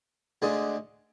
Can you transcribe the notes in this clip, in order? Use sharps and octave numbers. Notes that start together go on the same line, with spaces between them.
D2 D3 G#3 D4